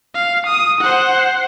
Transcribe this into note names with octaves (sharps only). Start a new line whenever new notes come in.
F5
D#6
C5 F#5